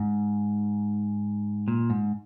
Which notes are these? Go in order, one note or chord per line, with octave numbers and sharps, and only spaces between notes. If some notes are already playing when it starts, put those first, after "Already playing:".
Already playing: G#2
A#2
G#2